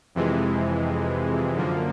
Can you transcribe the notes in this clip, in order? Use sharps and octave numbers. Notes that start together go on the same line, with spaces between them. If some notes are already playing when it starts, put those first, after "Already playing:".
F2 C3 E3 G#3
F#2 D3 F3 A#3